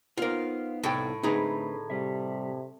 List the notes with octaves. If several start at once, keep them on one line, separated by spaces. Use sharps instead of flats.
B3 D#4 F4 A#4 C5 F5
C2 A2 A4 G5
D3 A3 C4 D#4 G#4 B4 A#5
C3 G3 E5